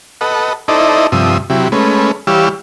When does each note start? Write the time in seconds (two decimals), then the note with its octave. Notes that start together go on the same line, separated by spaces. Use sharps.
0.21 A4 B4 D#5 F#5
0.68 D#4 E4 A4 C5 D5 D#5
1.12 G2 C3 F3 E5 D#6
1.50 C3 F#3 E4 G4
1.72 G#3 A3 C#4 B4
2.27 E3 G3 G4 C#5 F5 E6